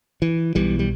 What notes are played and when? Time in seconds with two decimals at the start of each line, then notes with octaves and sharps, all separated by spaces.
0.22 E3
0.55 B1 B2 E3 G3
0.79 G3